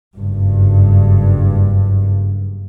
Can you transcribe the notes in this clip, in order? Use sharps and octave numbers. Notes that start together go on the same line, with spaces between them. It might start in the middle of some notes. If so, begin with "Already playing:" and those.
F#1 G2